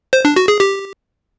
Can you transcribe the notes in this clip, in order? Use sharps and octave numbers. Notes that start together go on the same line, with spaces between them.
C5
D4
F#4
G#4
G4